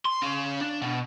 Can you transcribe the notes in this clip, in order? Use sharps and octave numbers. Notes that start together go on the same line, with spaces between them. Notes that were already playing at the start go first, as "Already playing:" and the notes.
C6
C#4 F5
D4
B2